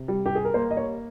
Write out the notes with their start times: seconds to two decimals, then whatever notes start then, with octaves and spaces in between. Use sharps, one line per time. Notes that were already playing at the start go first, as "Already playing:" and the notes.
Already playing: C3
0.08 G3
0.26 G4
0.35 G#4
0.45 A#4
0.54 A#3 C5
0.71 D#5
0.77 C#5